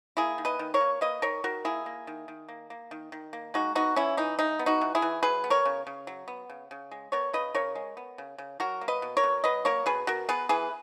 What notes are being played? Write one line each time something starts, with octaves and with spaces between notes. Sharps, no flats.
A#3 E4 G#4
D#3
B4 D#5
D#3
A#4 C#5
A#3
A#3 B4 D#5
D#3 A#4 C#5
D#3 F#4 A#4
A#3 E4 G#4
A#3
D#3
D#3
A#3
A#3
D#3
D#3
A#3
G#3 D#4 F#4
B3 D#4 F#4
E3 C#4 E4
E3 D#4
G#3 D#4
B3
D#4 F#4
E3
E4 G#4
E3
F#3 G#4 B4
B3
A#4 C#5
C#3
C#3
F#3
B3
C#3
C#3
G#3
B3 A#4 C#5
C#3 B4 D#5
C#3 A#4 C#5
G#3
B3
C#3
C#3
F#3 F#4 A#4
A#3
B4 D#5
B2
A#4 C#5
B2
F#3 B4 D#5
A#3 A#4 C#5
B2 G#4 B4
B2 F#4 A#4
B3 G#4 B4
E3 G#4 B4